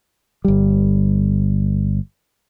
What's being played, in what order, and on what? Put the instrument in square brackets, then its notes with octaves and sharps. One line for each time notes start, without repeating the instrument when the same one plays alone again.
[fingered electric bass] G1 G3